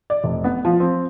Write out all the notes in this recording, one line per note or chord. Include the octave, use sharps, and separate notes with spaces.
D5
F1
B3
F3
C4